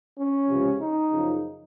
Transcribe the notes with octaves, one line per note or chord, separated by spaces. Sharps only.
C#4
C#2 C3 F3
D#4
F#2 C#3 F3